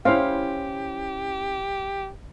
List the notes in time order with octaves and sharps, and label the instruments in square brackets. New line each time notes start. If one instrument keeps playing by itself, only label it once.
[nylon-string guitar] C#4 E4 [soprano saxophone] G4 [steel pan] C5 F5